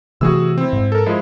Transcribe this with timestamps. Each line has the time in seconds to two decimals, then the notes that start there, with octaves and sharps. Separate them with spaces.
0.21 C3 E3 A3 F#4 G#4 E6
0.58 C4 E4
0.73 G#2
0.92 A4 A#4
1.06 F3 G#3 E4